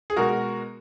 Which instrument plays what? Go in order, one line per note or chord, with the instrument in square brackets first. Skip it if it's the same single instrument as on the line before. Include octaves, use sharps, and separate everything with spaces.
[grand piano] G#4
B2 G#3 F#4 A#4